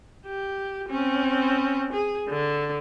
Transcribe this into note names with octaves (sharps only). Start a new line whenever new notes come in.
G4
C4 C#4
G#4
D3